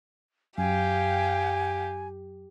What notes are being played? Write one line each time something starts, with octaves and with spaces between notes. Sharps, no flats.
F#2 G4 F5 G5 G#5